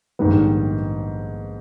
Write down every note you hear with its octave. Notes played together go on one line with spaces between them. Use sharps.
A#1 G#2 D#3 G3 B3